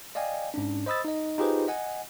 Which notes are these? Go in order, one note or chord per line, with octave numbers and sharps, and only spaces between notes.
D5 D#5 F5 G5 G#5
G#2 C#4 D4
C5 D#5 B5 D#6 E6 A6
D#4 D#5
D#4 F4 G4 G#4 B4 C5
D#5 F#5 G#5